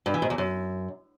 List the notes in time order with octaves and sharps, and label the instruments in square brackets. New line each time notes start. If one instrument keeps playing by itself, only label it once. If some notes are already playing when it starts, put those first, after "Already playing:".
[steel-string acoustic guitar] G2
E3
G#2
E2
F#2